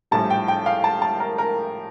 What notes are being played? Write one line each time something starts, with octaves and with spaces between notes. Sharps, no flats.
A#1 A2 G3 A5
G5
G5
F5
A5
A5
A#4
A#4